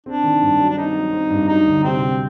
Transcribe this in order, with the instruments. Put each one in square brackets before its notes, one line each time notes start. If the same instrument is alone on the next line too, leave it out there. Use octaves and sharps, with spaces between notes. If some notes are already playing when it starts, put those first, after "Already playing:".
[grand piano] C4 [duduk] D4
[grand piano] D#3
G2
F#3
[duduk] D4
[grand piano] C4 [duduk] D#4
[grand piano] F#3
C4
G2
[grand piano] F#3 [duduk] D#4
[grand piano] D2
[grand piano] C3 [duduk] C4
[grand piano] C3